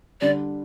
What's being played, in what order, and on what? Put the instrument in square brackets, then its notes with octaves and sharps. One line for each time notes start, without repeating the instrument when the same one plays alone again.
[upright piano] D3 G3 D4 [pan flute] D5